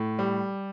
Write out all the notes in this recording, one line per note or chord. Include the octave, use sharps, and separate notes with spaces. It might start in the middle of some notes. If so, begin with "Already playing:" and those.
Already playing: A2
G3